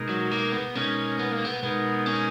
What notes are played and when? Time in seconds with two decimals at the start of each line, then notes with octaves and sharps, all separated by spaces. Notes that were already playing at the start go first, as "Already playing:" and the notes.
Already playing: B2 G#3 D#4 A#4
0.09 F#3
0.31 A#3
0.52 B3
0.75 B2 G#3 C#4 D#4 A#4
1.19 B3
1.31 A#3
1.45 B3
1.62 B2 G#3 B3 D#4 A#4
2.06 C#4